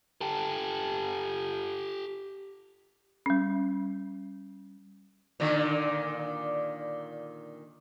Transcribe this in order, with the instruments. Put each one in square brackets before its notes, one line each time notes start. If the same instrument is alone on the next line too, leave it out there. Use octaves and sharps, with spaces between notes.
[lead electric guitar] G4 A4
[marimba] G3 C#4
[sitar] A#2 D3 D#3